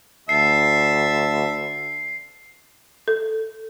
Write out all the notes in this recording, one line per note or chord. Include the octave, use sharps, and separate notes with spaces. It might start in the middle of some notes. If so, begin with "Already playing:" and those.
D2 E5 A5 C7
A4